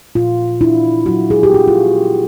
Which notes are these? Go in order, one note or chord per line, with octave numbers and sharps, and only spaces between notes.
A#2 F4
D4 E4
F#3 F#4
G#4
G4
B3 F#4
F4